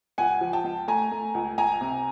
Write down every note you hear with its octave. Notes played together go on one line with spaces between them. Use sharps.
C#2 F#5 G#5
F3
G5 A5
C#2
A3 G#5 A#5
A3
C#2
C#2 G#5 A#5
C3